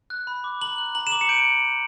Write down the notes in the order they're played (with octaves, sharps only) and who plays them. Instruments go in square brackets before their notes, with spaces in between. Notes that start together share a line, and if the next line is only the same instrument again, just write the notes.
[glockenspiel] F#6
B5
D6
A#5 F#7
F#6
A#5 F#7
E7
D6 F#7
C#7
G6 D7